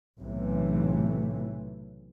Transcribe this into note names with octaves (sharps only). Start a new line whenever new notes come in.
B1 A2 C3 E3 A3